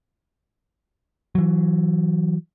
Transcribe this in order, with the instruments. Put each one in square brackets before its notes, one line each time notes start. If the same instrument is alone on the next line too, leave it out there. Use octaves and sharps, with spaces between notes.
[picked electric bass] E3 F#3